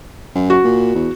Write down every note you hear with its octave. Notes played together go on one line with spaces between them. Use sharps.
F#2
F#4
A#2
E2